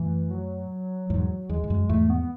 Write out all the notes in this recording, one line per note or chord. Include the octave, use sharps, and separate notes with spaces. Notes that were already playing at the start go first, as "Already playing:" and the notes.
Already playing: F#2 A2 E3
F#3
E2 G#2 F#3
E2 G#3
E2
F#2
E2 G#2 A3
B3